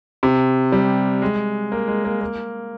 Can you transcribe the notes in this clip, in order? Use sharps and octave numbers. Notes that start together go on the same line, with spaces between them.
C3
G3
G#3
A#3
G#3
A#3
A#3